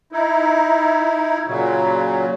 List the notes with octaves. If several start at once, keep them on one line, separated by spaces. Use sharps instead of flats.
D#4 E4
A#2 C#3 F#3